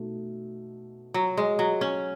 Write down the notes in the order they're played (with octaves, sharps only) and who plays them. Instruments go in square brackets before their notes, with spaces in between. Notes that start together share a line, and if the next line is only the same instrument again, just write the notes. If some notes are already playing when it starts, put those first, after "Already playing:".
Already playing: [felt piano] B2 A3 D#4
[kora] F#3
G#3
F#3
C#4